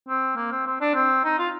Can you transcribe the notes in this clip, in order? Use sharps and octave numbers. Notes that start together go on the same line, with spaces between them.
C4
A#3
C4
C4
D4
C4
D#4
F4